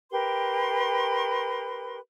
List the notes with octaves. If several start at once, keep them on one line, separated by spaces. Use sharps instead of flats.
G4 A#4 B4 C6